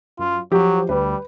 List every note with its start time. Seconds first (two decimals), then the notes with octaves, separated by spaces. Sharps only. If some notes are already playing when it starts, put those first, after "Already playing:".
0.19 F#2 F4
0.52 F3 F#3 G4
0.89 D2 G3 B4